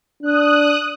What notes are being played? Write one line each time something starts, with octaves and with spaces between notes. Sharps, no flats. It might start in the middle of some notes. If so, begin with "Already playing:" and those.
D4 D#6 F#6